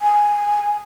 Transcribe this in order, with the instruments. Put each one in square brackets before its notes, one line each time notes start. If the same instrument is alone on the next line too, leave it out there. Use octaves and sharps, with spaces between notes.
[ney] G#5